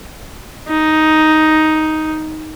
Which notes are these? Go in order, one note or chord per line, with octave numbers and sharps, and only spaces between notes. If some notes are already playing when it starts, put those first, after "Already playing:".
D#4